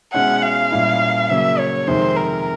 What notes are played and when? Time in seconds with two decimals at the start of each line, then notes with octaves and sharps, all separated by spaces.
0.14 B2 G#3 C#4 E4 F#5
0.42 F5
0.72 A#2 G3 A#3 C#4 E4
1.30 C#3 F#3 A#3 E5
1.59 C#5
1.88 F2 C3 D#3 G#3 C5
2.17 A#4